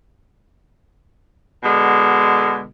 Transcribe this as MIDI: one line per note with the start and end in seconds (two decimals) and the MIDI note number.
1.63 2.65 47
1.63 2.65 50
1.63 2.65 56